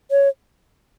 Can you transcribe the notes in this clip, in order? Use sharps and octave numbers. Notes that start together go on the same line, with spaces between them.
C#5